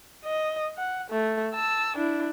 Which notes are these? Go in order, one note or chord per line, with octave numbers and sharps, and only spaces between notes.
D#5
F#5
A3
A5 E6
D4 E4